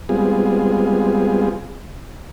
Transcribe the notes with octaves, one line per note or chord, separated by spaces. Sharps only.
G3 G#3 B3 C4 F4 G#4